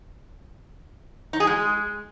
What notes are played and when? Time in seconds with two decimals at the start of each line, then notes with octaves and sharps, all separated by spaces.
1.33 D#4
1.40 G#4
1.47 G#3